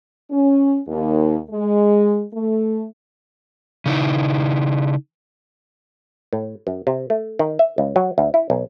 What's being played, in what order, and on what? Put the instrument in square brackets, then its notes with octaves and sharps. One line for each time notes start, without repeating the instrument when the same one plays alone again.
[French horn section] C#4
D#2
G#3
A3
[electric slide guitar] C#3 D#4 E4
[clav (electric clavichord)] A2
F#2
C3
A3
D#3
E5
C#2
F#3
D2
E4
B1